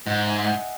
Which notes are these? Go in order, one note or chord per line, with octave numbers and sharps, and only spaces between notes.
G#2 D#5 F#5
E5 G#5
D#5 F#5